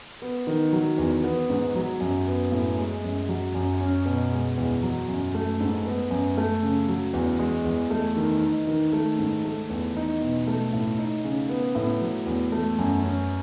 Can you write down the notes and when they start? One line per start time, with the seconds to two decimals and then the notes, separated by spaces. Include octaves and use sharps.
0.22 B3
0.47 D#3
0.73 F#3
0.98 E2
1.24 B3
1.50 G#2
1.75 F#3
2.01 F#2
2.27 B3
2.52 A2
2.78 G#3
3.04 F#2
3.29 F#3
3.55 F#2
3.81 C#4
4.06 B2
4.32 G#3
4.57 E2
4.83 F#3
5.09 F#2
5.34 A3
5.60 G#2
5.85 B3
6.11 F#2
6.37 A3
6.63 C#3
6.88 F#3
7.14 E2
7.39 G#3
7.65 E2
7.90 A3
8.17 D#3
8.42 D#4
8.67 D#3
8.93 A3
9.19 G#2
9.45 A3
9.70 E2
9.96 D#4
10.21 B2
10.47 A3
10.73 A2
10.98 D#4
11.24 C#3
11.49 B3
11.75 A2
12.01 F#3
12.26 E2
12.52 A3
12.79 F#2
13.03 C#4